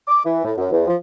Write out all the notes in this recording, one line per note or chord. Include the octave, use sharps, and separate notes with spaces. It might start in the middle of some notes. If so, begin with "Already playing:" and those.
D6
E3
A2
F#2
E2
F3